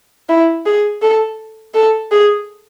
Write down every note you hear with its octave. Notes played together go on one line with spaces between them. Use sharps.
E4
G#4
A4
A4
G#4